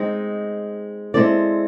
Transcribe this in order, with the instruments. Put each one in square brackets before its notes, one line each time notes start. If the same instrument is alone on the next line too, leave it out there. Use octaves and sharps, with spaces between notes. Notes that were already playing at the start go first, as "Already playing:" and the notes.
Already playing: [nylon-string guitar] G#3 C4 D#4
G#3 C4 E4 A4 D5